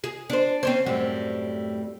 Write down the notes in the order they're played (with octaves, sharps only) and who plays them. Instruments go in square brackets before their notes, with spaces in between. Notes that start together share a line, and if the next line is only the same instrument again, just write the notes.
[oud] G#4
D4 C5
C4 C#4 C5
F#2 A2 G3